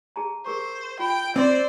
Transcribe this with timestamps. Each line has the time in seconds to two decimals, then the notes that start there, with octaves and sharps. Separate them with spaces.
0.16 G#4 A5 A#5
0.46 G#4 A#4 C5 C#6
0.99 F4 G5 B5
1.36 C4 C5 D5